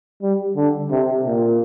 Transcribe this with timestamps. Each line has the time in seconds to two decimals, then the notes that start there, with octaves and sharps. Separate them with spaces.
0.22 G3
0.56 D3
0.91 C3
1.26 A#2